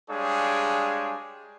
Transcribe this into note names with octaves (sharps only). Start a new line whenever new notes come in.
G3 G#3 D4 G#4 C#5 F5